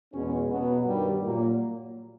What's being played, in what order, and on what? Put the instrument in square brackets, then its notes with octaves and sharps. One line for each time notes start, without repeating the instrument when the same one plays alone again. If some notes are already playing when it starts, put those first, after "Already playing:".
[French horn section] E2 B2 G#3 C#4
B2 F#3 B3
G2 D#3 G3
A#2 F#3 A#3